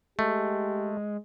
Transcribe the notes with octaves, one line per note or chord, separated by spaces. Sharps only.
G#3 A3 G4